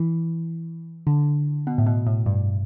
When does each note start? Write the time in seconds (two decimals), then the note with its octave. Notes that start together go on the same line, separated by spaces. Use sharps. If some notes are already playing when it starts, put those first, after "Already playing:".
Already playing: E3
1.07 D3
1.67 B2
1.78 A2
1.86 B2
2.07 A2
2.26 G2